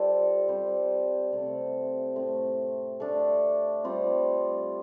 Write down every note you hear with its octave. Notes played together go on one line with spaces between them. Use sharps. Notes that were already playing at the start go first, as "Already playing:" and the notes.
Already playing: G3 F4 A4 C5
G3 C4 G4 C5
C3 A3 C4 A4
A2 A3 C4
A3 D4 A4
G3 C4 F4 C5